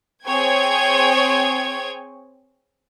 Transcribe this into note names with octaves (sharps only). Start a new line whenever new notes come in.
C4 G#4 C#5 G5 C#6 G#6